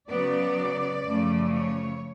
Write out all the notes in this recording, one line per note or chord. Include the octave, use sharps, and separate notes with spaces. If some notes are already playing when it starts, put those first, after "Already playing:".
C#3 F#3 B3 D5
F#2 C#3 F3 A3
C#5